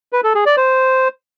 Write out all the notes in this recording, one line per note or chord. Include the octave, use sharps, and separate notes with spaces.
B4
A4
G#4
D5
C5